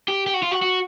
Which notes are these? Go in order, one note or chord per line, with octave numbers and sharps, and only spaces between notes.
G4
G4
F#4
F4
F#4
F#4